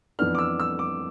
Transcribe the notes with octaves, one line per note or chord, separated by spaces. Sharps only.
F2 E3 B3 D4 F6
D6
E6
E6
D6